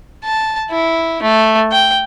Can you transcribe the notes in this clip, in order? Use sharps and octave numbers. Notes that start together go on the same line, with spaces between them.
A5
E4
A3
G5